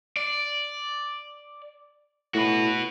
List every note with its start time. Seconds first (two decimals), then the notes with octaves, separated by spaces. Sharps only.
0.17 D5
2.34 A2 F#4 B4